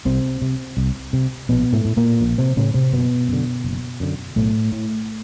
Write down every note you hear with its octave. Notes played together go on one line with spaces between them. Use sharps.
C2 C3 C4
C3
C2
C3
A#1 B2 B3
A2 A3
A2
A#2 A#3
A#1
C3 C4
A2 C#3 C#4
C3 C4
F#1 B2 B3
F#2 D3
F#1
F#2 D3
B1 A2 A3
A2